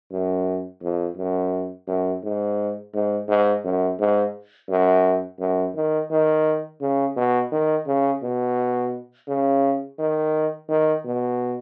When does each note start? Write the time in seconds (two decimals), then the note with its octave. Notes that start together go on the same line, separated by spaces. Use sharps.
0.12 F#2
0.82 F2
1.17 F#2
1.88 F#2
2.23 G#2
2.94 G#2
3.29 G#2
3.64 F#2
3.99 G#2
4.69 F#2
5.40 F#2
5.75 D#3
6.11 D#3
6.81 C#3
7.16 B2
7.52 D#3
7.87 C#3
8.23 B2
9.28 C#3
9.99 D#3
10.69 D#3
11.05 B2